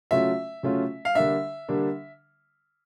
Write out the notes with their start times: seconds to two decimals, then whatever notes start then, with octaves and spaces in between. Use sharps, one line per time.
0.11 C#3 F#3 A3 C#4 F4 E5
0.63 C#3 F#3 A3 C#4 F4
1.05 F5
1.15 D3 G3 A#3 D4 E5
1.69 D3 G3 A#3 D4